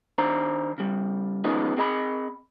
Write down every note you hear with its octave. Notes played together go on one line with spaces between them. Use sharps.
D#3 D4 C5 A#5
C#3 G3
D#3 F3 G#3 B3 C#4 D#4
C4 G#4 D#5 A#5 B5